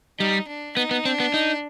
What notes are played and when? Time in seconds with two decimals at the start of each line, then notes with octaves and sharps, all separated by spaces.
0.19 G3 D#4
0.48 D4
0.76 B3 D#4
0.91 B3
1.05 C4 D4
1.20 B3
1.34 D#4